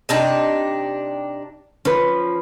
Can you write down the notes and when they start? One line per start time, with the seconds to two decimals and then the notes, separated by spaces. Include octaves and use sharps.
0.09 C3 D4 D#4
1.85 F3 C#4 B4